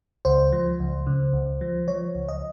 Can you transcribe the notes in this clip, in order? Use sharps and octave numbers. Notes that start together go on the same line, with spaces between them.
C#2 C5
F3
C#2
C#3
C#2
F3
F3 C#5
C#2
D#5